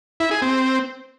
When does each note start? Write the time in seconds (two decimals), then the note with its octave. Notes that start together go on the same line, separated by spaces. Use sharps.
0.20 E4
0.31 G#4
0.42 C4